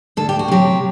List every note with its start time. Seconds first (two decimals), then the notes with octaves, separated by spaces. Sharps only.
0.17 D2 A4
0.29 G4
0.39 F#4
0.48 C3 F#3 G4